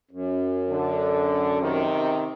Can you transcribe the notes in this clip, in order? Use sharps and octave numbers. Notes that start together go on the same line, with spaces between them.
F#2
D3
C3 D#3